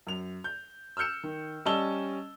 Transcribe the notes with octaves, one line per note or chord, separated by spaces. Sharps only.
F#2 F7
G6
E6 F6 G6 C#7 E7
D#3
G3 C#4 D#5 A5 E6 G7